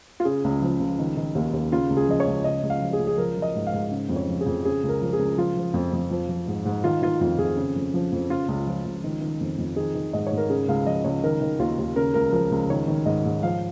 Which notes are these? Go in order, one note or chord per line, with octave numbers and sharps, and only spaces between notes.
F4
C#3 G#4
C#2
F3
C#2
D#3
D#3
D#2
D#2
C#3 F4
C#2
G#4
F3 D#5
C#5
C#2
C#3 D#5
C#2
F5
F3
G#4
C#2
G#4
F3 A#4
F3
D#5
G#2
F5
G#2
C#3
F2
C#5
F3
G#4
F2
C#3 G#4
C#2
A#4
F3
G#4
C#2
F3 F4
F3
F2
F2
F3
F3
G#2
G#2
D#3 F4
D#3 F4
F2 F4
F2 G#4
C#3
F2
F3
F2
C#3 F4
C#2
F3
C#2
D#3
D#3
F2
F2
D#3 G#4
D#3
G#2 D#5
C#5
G#2
A#4
C#3 G#4
C#2 F5
F3 D#5
C#2 C#5
D#3 A#4
D#3
D#2 F4
D#2
C#3 A#4
C#2 A#4
F3 A#4
C#2
D#3 C#5
D#3
G#2 D#5
G#2
F3 F5